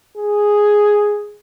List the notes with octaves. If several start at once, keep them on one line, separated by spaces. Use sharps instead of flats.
G#4